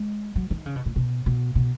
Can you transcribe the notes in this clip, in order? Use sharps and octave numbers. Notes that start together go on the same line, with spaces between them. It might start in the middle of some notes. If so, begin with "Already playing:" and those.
Already playing: G#3
F#3
D#3
C#3
B2
A#2
B2
B2
B2